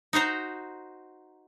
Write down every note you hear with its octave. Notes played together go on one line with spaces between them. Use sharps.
D#4 F#4 C5 A#5